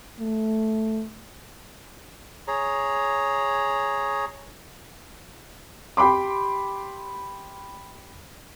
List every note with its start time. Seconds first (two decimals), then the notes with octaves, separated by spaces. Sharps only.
0.20 A3
2.48 G#4 C#5 A#5
5.97 G4 G5 B5 C6 D6